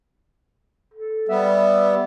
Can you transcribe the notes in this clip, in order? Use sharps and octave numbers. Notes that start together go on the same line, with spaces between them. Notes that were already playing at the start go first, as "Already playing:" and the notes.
A4
G3 B3 E5